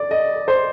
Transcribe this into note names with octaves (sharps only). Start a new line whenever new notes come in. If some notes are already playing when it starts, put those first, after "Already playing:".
Already playing: D5
D#5
C5